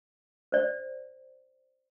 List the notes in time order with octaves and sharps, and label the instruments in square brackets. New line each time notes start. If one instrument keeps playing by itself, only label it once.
[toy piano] C5 D5